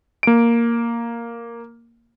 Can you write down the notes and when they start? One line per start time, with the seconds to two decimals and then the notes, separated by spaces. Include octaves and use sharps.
0.23 A#3 D7